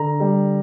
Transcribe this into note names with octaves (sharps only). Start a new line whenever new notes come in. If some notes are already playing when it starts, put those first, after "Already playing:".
Already playing: D3 A#5
G3